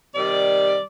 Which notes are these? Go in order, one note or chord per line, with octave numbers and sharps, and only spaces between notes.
C3 D#3 G3 D5